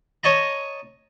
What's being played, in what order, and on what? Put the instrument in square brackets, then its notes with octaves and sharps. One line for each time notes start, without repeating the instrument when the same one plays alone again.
[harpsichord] C#5 D#5 A5 A#5